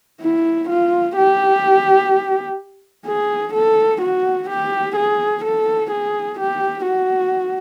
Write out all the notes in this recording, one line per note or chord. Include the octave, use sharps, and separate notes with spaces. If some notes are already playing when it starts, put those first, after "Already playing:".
E4
F4
G4
G#4
A4
F#4
G4
G#4
A4
G#4
G4
F#4